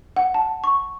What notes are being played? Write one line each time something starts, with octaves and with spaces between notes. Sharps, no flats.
F#5
A5
C#6